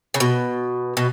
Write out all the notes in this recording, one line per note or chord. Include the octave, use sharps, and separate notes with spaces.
C#3
B2
B2